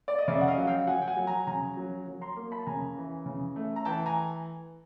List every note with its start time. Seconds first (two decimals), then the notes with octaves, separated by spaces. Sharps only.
0.08 D5
0.18 D#5
0.28 C#3 D5 E5
0.41 F#5
0.48 D#5 F5
0.58 F#3
0.67 F5 G5
0.87 F#3 F#5 G#5
1.02 G5
1.07 F#5 G#5
1.17 F#3
1.27 G#5 A#5
1.47 C#3 G#5 A#5
1.77 F#3
2.07 F#3
2.21 A#5 C6
2.36 A#3
2.52 A5 B5
2.66 C#3 G#5 A#5
2.97 E3
3.26 C#3
3.56 A3
3.76 A#5
3.85 E3 G5 A5
4.06 G#5 A#5